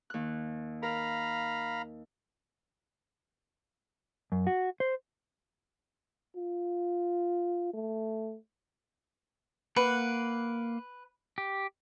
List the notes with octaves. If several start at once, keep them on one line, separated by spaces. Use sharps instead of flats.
D#2 F#6
A#4 F5 A#5 B5
F#2
F#4
C5
F4
A3
A#3 B4 F#5
G4